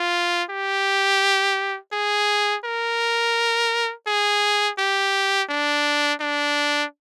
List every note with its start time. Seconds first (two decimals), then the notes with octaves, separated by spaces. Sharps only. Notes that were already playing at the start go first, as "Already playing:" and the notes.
Already playing: F4
0.50 G4
1.93 G#4
2.65 A#4
4.07 G#4
4.79 G4
5.49 D4
6.21 D4